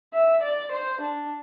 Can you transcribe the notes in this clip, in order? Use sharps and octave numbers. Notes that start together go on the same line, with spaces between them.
E5
D5
C5
D4